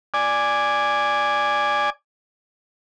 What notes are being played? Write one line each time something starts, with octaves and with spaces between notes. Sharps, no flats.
D5 G#5